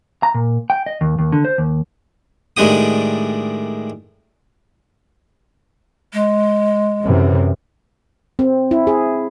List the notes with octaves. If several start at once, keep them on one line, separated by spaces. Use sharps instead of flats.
A#5
A#2
G5
D#5
D#2
D#2
D3
C5
D#2
A2 D#3 G#3 D4 G4 D#6
G#3
F#2 C3 E3
C4
E4
G#4